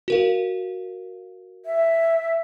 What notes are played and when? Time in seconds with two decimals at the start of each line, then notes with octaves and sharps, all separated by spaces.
0.08 F#4 A#4 F5
1.66 E5